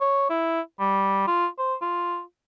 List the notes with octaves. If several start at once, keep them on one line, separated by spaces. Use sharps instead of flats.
C#5
E4
G3
F4
C5
F4